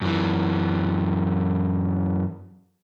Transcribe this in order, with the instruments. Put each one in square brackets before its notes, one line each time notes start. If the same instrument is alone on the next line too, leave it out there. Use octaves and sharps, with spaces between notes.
[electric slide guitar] F#2 E3